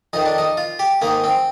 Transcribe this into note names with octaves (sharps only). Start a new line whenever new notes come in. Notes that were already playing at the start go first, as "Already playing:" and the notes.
F2 D#3 D#4
D4
D#4
F4
G4
G#2 D#3 A#3
C4